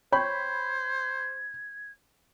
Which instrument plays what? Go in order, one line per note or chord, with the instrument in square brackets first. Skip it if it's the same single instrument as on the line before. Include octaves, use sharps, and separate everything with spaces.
[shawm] C5 [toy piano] C#5 G5 C#6 [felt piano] B5 [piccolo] G#6